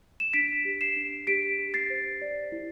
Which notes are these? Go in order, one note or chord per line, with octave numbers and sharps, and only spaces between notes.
E7
D4 B6 D7
G4
C7 E7
D4
G4 B6 D7
G4
A6 C7
C5
D5
E4